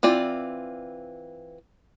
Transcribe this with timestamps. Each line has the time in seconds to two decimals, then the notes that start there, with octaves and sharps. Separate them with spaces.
0.03 E3 C4 F4 D5